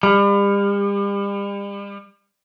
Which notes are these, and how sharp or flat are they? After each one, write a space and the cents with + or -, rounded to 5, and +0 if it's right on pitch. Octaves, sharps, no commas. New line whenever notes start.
G3 +40